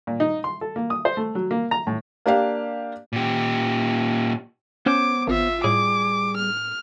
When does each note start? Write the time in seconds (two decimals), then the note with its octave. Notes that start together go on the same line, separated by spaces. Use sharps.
0.07 A#2
0.20 D#4
0.44 C6
0.61 A4
0.76 A#3
0.90 D#6
1.05 C5
1.17 A3
1.35 F#3
1.51 A#3
1.71 A#5
1.87 A2
2.26 A#3 D4 G4 F5
3.13 A#2 G4
4.86 B3 C#4 C5 C#5 D6
5.27 G#1 F4 E5
5.64 A2 G3 G#4 D6
6.37 F6